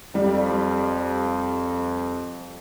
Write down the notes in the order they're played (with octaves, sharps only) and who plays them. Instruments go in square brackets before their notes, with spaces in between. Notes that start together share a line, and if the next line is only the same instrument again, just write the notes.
[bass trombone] F2 [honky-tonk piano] G3